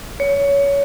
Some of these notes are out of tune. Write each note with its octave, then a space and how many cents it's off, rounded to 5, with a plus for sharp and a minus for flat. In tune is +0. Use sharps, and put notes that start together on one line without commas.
C#5 +20